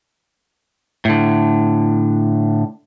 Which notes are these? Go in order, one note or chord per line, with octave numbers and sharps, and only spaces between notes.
A2 D3